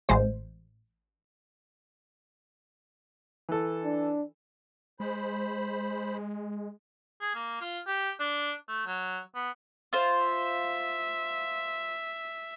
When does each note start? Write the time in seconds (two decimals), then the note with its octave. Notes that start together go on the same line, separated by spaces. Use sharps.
0.09 A1 G#3 C5
3.49 E3 A4
3.84 D4
5.00 G#3 C5 B5
7.21 G#4
7.34 A#3
7.61 F4
7.87 G4
8.20 D4
8.68 A3
8.86 F#3
9.35 B3
9.93 F4 C5
10.25 E5